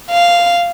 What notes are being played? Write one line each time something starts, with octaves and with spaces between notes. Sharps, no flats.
F5